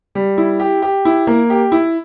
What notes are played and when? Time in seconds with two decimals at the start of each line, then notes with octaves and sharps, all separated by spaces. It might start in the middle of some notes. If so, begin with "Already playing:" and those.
0.15 G3
0.38 E4
0.60 G4
0.82 G4
1.05 E4
1.27 A#3
1.50 G4
1.72 E4